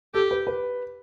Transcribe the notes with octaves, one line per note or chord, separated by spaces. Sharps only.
G4 A4
B4
B4